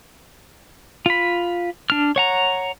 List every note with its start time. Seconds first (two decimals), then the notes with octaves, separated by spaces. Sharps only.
1.06 F4 B5
1.90 D4 F6
2.16 C#5 F#5 A#5